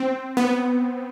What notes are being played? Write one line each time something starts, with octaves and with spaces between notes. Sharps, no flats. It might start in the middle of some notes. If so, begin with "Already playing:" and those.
Already playing: C4
B3